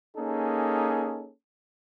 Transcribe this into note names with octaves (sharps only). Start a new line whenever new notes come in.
A#3 C#4 D#4 G#4 A4